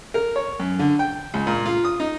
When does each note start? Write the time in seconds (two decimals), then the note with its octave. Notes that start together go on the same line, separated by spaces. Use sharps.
0.14 A#4
0.36 C#5
0.60 F#2
0.79 D3
0.99 G5
1.34 C#2
1.47 A#2
1.66 F4
1.85 D#6
2.00 D#4